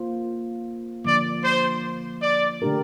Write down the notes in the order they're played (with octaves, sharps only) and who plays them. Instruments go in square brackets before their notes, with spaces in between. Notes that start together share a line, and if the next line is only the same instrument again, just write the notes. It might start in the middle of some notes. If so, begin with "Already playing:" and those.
Already playing: [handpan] A#3 F4 C5
[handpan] D3 F3 A#3 [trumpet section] D5
[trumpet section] C5
D5
[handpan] D3 A3 D4 G4 A#4